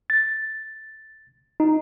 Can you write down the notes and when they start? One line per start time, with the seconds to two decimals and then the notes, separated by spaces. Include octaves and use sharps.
0.10 A6
1.60 D#4